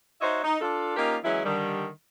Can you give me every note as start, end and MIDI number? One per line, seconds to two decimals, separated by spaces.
0.21 0.40 63
0.21 0.40 66
0.21 0.40 72
0.21 0.40 73
0.21 0.40 75
0.21 0.40 76
0.44 0.59 63
0.60 0.94 62
0.60 0.94 65
0.60 0.94 69
0.97 1.17 58
0.97 1.17 61
0.97 1.17 63
0.97 1.17 65
0.97 1.17 67
0.97 1.17 70
1.24 1.42 52
1.24 1.42 54
1.24 1.42 56
1.24 1.42 61
1.24 1.42 64
1.45 1.87 50
1.45 1.87 51
1.45 1.87 55